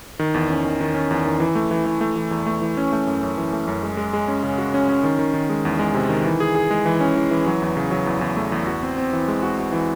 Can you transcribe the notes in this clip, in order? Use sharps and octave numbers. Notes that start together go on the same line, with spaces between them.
D#3
E2
C#4
D#3
D#3
C#4
E2
D#3
E3
A3
E3
E3
A3
E3
E2
A3
E3
C#4
A3
F#2
F#2
E3
A3
F#2
G#3
G#3
G#3
C#4
C#3
F#4
C#4
C#4
D#3
D#3
D#3
G#3
E2
G#3
C3
D#3
E3
G#4
G#4
G#3
E3
C#4
E3
E3
F#3
E2
C#3
F#3
E2
E2
A3
E2
F#4
C4
C4
E3
G#3
F#4
F#4
E3